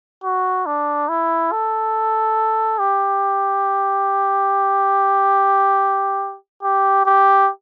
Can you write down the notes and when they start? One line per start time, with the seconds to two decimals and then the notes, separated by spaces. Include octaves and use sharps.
0.24 F#4
0.66 D4
1.09 E4
1.52 A4
2.79 G4
6.63 G4
7.06 G4